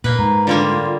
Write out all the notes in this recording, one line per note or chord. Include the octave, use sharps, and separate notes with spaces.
A#2 A#3 B4
G#2 A#5
D3 G3 A#3 F4